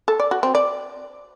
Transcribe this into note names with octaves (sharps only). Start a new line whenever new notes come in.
A4
D5
F#4
C4
D5